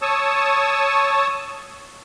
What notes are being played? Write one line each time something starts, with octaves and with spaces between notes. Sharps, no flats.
C#5 A5 C#6 D#6 E6